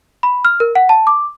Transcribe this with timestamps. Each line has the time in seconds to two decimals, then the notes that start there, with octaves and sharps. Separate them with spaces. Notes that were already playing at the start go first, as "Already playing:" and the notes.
0.23 B5
0.45 F6
0.60 A#4
0.75 F#5
0.89 A5
1.07 D6